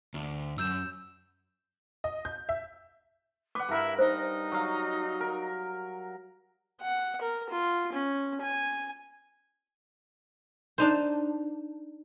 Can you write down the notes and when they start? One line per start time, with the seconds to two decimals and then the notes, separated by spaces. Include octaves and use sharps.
0.14 D2
0.58 F#2 E6 G6 E7
2.04 D#5
2.25 G6
2.49 E5
3.55 B4 F#5 D6
3.69 G2 E4 A#4
3.99 D#4 C5
4.52 F#3 F5
5.21 A#4
6.80 F#5
7.21 A#4
7.50 F4
7.93 C#4
8.41 G#5
10.78 D4 D#4 C5